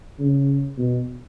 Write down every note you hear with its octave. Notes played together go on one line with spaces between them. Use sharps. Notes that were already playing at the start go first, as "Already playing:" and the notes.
C#3
B2